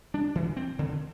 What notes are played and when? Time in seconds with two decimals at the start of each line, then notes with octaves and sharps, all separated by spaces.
0.14 G3 D4
0.35 E3
0.57 C4
0.79 D3